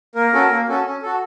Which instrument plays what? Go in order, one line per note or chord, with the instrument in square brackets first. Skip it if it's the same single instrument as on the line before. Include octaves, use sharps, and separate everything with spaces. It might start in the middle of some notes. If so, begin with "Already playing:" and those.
[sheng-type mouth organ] A#3 A#4
C#4 F#4 A4
A#3
C#4 F#4 A4
C#4
F#4 A4